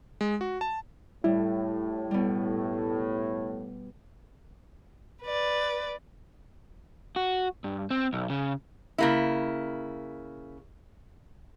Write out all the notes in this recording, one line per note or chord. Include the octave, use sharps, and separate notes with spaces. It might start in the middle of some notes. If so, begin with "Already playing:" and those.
G#3
F#4
A5
A2 G3 E4
B2 G3
B4 D5
F#4
G2
C4
B1
C#3
C#3 A#3 E4